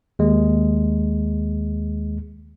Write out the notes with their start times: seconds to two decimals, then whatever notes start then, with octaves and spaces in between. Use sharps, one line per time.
0.19 D#2 G#3